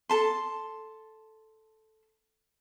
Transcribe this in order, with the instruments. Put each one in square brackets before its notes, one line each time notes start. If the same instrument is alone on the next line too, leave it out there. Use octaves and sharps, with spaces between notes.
[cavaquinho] A4 A5 C6